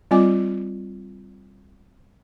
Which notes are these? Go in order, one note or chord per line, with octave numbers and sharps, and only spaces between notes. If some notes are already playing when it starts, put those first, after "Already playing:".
G3 C4 F4 D#5 G#5 D6